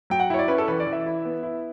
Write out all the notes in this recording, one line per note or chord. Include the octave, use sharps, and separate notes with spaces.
F#3 G5
F#5
E4 C#5
D5
C#4 B4
A4
E3 B4
D5
E3
E5
E4
B3
E4